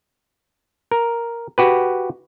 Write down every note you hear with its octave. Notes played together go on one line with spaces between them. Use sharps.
A#4
F#4 G4 B4